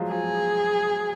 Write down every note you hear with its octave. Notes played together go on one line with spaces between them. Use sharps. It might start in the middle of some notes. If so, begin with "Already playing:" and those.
Already playing: F3 F#3 G#3
F3 G#4